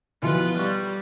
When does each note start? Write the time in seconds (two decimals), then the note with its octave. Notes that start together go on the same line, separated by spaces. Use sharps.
0.22 B2 E3 F3 F4 B4
0.58 G3 C#6